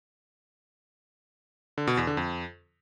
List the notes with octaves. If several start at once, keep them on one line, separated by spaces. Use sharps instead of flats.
D3
B2
E2
D3
F2